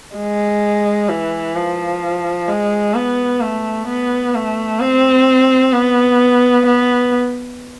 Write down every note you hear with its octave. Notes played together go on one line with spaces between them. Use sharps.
G#3
E3
F3
G#3
B3
A3
B3
A3
C4
B3
B3